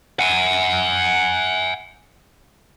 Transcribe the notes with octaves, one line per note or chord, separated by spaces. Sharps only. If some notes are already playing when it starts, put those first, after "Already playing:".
F#5 G#5